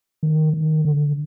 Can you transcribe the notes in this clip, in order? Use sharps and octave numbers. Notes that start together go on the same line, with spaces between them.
D#3
D#3
D3